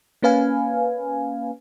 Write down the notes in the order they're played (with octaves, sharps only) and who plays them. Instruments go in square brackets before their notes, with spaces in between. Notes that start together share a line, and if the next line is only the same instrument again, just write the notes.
[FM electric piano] A#3 C#4 B4 F5 G#5